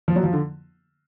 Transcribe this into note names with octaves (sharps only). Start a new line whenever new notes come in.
F3
F#3
F3
D3